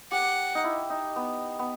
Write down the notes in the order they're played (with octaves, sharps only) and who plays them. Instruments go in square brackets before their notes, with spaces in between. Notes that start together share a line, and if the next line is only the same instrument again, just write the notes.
[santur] G4 [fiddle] F#5
[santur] D#4
E4
D#4
B3
B3